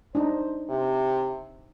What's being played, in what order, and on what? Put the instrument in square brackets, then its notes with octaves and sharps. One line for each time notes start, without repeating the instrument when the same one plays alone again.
[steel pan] D4 D#4 [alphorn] C5
[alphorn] C3